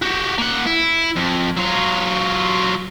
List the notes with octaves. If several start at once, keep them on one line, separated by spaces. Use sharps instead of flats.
F#4 G4
A#3 F#5
E4
F2
F#3 F4